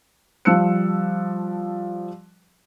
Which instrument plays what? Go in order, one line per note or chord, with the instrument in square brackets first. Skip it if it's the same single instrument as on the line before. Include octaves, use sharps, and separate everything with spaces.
[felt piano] F3 G3 A5 E6 F#6 C#7